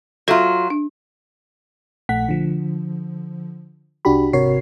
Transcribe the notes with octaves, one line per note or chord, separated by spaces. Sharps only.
F#3 F4 A4 E5 A#5
D4
A#1 A3 F#5 B6
D3 F3
C2 D4 F#4 G4 B5
G#1 C3 F#4 A#4 C#5 C7